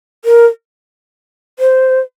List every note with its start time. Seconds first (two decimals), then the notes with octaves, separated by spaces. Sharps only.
0.25 A#4
1.59 C5